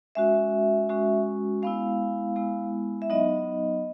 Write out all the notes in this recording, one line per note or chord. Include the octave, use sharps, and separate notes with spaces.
G#3 C#4 F#4 E5
G#3 C#4 F#4
G#3 B3 E4 F5
G#3 B3 E4
E5
F#3 B3 D#4 D#5